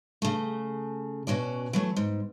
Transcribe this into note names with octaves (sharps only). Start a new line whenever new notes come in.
C#3 A3
B2 C#4 F#4 D5
E3 F#3 A3
G#2